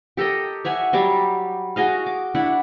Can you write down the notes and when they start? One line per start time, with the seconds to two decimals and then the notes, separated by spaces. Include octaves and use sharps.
0.17 G4 A4 A#4 D#5
0.65 C#5 E5 F#5 G#5
0.93 F#3 G3 A5 D6
1.76 F#4 G#4 D#5 F5
2.06 D6
2.35 D4 E4 F#5 B5